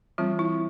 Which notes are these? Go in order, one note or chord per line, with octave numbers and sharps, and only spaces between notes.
E3 G3 C4 F4
E4